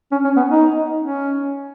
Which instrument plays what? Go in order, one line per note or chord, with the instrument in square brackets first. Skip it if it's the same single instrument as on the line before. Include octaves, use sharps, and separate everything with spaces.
[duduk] C#4
C#4
B3
D#4
C#4